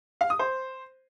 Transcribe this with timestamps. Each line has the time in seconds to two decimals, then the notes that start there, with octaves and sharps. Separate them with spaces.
0.21 F5
0.30 D#6
0.39 C5